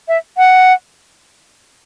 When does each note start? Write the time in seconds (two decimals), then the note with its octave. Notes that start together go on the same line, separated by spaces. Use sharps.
0.08 E5
0.37 F#5